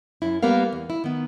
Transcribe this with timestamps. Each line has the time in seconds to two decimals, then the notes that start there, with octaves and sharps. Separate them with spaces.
0.22 F#2 E4
0.43 G3 A#3 B3 A#4 F5
0.73 E2
0.90 E4
1.04 D#3 B3